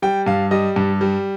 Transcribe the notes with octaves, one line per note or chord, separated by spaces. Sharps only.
G3 G5
G2 F5
G3 D#5
G2
G3